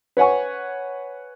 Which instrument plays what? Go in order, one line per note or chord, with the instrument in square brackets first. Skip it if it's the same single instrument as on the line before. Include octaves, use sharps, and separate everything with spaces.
[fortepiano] B4 C#5 F#5 G#5 C#6